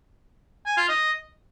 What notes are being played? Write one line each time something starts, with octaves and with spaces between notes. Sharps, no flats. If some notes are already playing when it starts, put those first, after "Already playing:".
G#5
F4
D#5